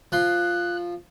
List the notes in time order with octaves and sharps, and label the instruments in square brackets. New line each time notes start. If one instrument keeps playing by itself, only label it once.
[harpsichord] F3 C6 [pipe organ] F#6